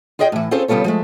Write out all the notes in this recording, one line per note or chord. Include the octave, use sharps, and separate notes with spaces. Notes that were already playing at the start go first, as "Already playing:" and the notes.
F4 G#4 D5 D#5 G5
A2 E3
C4 C#4 F4 G#4 A4 C5
C#3 G3 B3 F4 A4 C#5
F3 G#3 A3